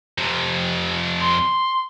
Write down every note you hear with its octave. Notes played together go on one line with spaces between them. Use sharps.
F2 C3
C6